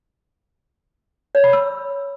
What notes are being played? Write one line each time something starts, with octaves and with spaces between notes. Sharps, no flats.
C#5
B5
E6